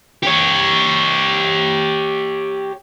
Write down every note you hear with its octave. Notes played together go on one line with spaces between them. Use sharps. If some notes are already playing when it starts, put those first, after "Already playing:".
G4 C#5